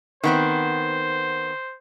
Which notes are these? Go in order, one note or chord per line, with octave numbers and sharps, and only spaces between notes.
D#3 B3 C4 C5